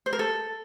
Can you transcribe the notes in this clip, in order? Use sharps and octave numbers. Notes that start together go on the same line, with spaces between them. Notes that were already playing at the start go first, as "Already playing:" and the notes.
C5
A#4
A4